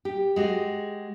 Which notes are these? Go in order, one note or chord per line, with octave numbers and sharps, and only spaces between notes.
G4
G#3 F#4 G4